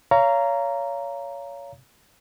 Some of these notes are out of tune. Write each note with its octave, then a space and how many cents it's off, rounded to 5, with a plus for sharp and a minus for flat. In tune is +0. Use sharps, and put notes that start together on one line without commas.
C#5 +25 F5 -25 A#5 +0